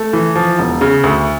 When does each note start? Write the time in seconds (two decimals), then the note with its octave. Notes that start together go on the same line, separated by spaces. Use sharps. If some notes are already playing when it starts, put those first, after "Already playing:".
Already playing: A3
0.13 E3
0.35 F3
0.59 E1
0.81 C#3
1.04 D2